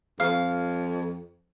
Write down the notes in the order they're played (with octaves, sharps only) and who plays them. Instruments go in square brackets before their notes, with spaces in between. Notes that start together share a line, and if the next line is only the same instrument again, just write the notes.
[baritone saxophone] F2 [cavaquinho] F5